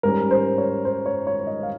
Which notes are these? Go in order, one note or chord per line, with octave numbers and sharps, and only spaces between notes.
G#2 G3 C#4 A#4
C5
C#5
C5
C#5
C#5
D#5
F5